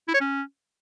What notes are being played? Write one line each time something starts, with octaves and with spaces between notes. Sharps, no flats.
E4
C#5
C#4